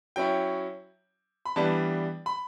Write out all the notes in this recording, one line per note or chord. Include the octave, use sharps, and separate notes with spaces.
F#3 C#4 E4 G5
B5
E3 G3 B3 D4 A5
B5